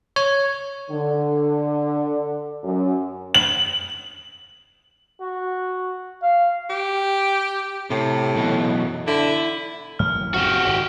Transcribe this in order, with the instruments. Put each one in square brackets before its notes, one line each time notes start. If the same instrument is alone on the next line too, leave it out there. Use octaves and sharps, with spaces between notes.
[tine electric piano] C#5
[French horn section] D3
F#2
[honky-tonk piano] F#7
[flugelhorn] F#4
F5
[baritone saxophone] G4
[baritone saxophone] A2 [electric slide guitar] C3
[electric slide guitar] F#2 B2 E3
[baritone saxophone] D3 [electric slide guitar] E4
[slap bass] A1 F#2 [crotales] F6
[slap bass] F#1 C4 [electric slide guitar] F#4 G4
[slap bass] G#1 C3